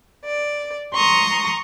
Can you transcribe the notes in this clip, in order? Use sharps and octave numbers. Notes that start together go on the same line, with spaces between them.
D5
A#5 C6 C#6 D#6